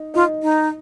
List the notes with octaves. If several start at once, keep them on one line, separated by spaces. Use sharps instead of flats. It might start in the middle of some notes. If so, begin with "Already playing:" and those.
Already playing: D#4
D#4 F4
D#4